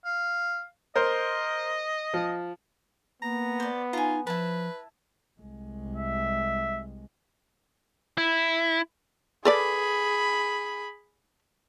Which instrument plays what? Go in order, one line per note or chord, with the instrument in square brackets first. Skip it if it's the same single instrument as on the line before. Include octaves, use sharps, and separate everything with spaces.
[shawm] F5
[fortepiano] A#4 C5 [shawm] D#5
[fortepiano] F3
[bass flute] A#3 [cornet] B3 [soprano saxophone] A#5
[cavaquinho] C5 D5
[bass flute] D#4 [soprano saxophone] F4 [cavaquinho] G#5 A#5
[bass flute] F3 [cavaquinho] E4 A5 [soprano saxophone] B4
[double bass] C2 G#3
[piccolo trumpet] E5
[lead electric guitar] E4
[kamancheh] G#4 B5 [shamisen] A4 B4 D5